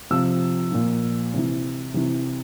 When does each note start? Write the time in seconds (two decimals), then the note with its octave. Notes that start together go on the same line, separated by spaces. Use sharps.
0.11 C3 F3 E6
0.72 A#2 F3
1.34 C3 E3
1.94 C3 E3